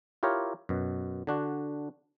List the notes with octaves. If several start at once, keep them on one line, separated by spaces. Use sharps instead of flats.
E4 F4 G4 A#4 C#5
F#2 B2
D3 D4 F#4